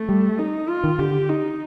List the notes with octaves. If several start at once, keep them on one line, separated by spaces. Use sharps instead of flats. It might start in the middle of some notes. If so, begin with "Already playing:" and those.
Already playing: A3
G3
D#4
F4
D#3
D3 G4
D#4